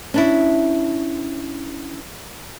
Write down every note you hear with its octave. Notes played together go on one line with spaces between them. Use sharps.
C#4 D4 E4